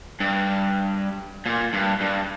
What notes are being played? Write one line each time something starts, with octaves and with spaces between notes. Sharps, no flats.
G2
A#2
G2
G2